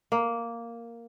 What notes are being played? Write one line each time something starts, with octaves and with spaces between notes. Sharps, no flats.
A#3